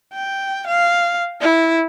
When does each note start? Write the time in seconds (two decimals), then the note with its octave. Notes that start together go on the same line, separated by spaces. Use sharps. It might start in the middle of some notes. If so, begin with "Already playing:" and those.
0.14 G5
0.67 F5
1.41 E4